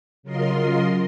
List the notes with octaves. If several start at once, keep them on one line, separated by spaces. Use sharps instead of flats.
C#3 F#3 F4 A#4 D#5 C6